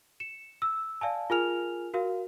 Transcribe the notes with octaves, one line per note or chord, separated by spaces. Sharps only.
C#7 E7
E6
D5 F5 G#5 A5
F4 G#4 A#4 G#5 F6 F7
F#4 A#4 F5